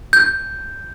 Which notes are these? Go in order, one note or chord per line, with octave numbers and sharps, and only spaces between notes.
G6